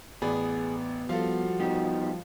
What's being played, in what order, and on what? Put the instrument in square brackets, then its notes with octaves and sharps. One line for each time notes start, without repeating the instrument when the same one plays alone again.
[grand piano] A1 D5 B5 [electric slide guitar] B3 [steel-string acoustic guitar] G#4
[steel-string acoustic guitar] F3 G3 [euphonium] F#4 [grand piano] A4 F5
[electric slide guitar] B3 D#4 G4